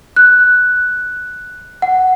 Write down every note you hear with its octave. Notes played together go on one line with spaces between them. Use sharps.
F#6
F#5